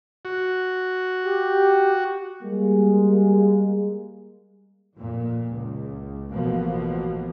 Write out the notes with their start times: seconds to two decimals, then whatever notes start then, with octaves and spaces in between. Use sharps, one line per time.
0.25 F#4
1.25 G4
2.42 G3 G#3 A#3
4.97 F2 A#2
5.51 C#2
6.32 A1 B2 F3 A#3